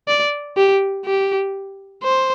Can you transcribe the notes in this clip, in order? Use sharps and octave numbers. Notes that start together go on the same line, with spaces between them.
D5
G4
G4
C5